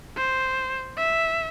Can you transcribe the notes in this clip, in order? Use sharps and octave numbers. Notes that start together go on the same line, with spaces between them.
C5
E5